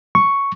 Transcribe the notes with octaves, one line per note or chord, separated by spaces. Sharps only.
C#6